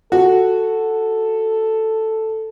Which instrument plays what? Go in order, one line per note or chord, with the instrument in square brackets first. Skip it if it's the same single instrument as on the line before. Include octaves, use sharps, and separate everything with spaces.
[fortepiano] F#4 [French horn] A4